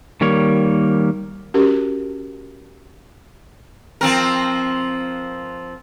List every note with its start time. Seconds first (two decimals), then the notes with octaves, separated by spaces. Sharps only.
0.21 D#3 G3 A#3 C#5
1.54 C#4 F#4 G4 A#4
4.01 F3 C4 A#4